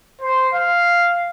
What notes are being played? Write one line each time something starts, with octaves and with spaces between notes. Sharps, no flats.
C5
F5